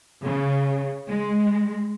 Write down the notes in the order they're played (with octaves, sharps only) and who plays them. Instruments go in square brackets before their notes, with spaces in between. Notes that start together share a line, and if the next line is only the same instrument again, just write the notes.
[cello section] C#3
G#3